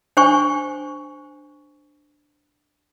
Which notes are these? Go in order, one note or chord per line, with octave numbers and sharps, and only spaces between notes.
D4 C5 G5 G#5 C#6